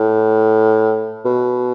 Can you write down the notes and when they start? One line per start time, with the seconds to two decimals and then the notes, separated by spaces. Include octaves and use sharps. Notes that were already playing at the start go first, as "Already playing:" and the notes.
Already playing: A2
1.25 B2